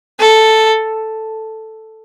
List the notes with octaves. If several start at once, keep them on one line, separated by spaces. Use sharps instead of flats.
A4